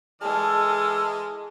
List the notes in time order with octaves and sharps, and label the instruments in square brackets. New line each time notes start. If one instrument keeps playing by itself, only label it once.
[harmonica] E3 D#5 F6 [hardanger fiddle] G#3 [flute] A4 [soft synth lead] A5